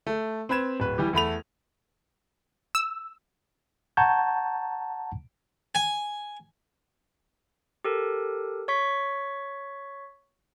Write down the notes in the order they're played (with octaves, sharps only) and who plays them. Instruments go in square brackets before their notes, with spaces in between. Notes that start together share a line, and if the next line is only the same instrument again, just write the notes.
[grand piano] A3
C4 B4 B5 G#6 E7
D1 B4
E3 G3 G4
E2 A3 B5 F7
[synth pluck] E6
[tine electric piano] F#5 A5 A#5 C#6 G6 G#6
[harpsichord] G#5
[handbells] G4 A4 A#4
C#5 C#6 B6